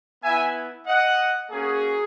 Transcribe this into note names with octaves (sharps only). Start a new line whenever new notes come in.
B3 E4 E5 G#5
D#5 F#5
A#3 C#4 F#4 G#4